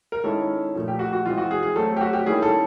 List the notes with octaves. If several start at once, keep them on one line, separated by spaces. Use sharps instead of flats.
A#4
D#3 G#3 C#4 E4 A4
A#2 F3 A3
G4
F#4
F#4
E3 G#3 C4 F4
F#4
G#4
G#4
F#3 A3 C4 A4
G4
F#4
G4
D#3 G3 A#3 C#4 E4 G#4
A4